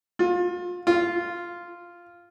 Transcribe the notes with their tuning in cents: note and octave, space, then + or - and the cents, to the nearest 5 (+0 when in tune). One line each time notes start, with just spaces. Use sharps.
F4 +30
F4 -5